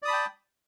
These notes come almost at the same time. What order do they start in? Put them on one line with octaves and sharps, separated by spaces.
D5 D#6 B5 A5 G5